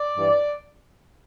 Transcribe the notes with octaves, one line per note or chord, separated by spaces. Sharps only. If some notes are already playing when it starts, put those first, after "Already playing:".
Already playing: D5
G2 E3